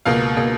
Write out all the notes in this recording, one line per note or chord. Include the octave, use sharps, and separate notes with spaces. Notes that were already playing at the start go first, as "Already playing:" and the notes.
C#2 B2 A#3 F5
B2 A#3